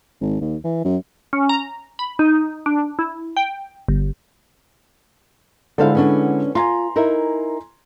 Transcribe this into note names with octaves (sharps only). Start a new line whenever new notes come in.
G#1
D#2
E3
F#2
C#4
A#5
B5
D#4
D4
E4
G5
G1
D3 G#3 E4 A4 C5 F5
B3 C#4 D4
F4 G#5 A#5 C6
D#4 E4 A#4